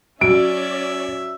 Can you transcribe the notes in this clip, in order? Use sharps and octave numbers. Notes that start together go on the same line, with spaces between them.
F#3 C#4 D5 E5 D7